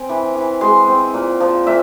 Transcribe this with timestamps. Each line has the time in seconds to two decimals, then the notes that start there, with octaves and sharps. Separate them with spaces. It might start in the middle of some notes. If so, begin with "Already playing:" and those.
Already playing: C4 G#5
0.09 E3
0.35 E3
0.61 G#3 C6
0.88 C4
1.14 A#2
1.40 F3
1.67 A#2 E5